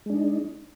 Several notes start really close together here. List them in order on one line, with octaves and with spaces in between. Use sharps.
G#3 D4 D#4